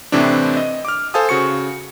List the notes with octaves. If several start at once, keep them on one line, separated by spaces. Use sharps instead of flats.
A2 C3 E3 C4 D4
D#5
D6 F6
A4 C5 F5 G#5 A5 D#6
C#3 F#4 C#6 C#7